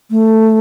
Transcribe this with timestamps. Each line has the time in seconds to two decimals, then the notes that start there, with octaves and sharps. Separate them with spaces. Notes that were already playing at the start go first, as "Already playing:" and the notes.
0.11 A3